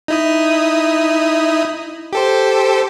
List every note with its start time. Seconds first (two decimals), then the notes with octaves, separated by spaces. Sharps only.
0.08 D#4 E4 D#6
2.13 G4 A4 C5